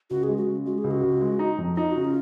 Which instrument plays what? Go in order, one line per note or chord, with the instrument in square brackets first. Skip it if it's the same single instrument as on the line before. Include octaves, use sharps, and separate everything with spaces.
[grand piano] C#2 [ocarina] F#4
[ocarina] G#4
[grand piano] G#3
[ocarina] F#4
[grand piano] C#3
[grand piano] G#3 [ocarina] F#4
[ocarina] G#4
[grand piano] C#2
[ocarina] F#4
[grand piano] C#2
G#3
D#4
F2
[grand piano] D#4 [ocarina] F4
[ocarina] F#4
[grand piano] C#3
[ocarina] F4